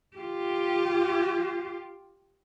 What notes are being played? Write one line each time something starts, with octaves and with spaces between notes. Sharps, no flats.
F4 G4